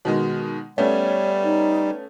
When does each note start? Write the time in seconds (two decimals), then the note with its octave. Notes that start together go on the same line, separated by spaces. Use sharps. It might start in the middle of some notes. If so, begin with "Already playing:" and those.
0.05 B2 D#3 G#3
0.78 G3 A3 B3 C#4 C#5
1.44 D#4